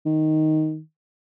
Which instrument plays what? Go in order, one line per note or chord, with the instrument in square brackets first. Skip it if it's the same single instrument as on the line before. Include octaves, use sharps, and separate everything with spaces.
[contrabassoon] D#3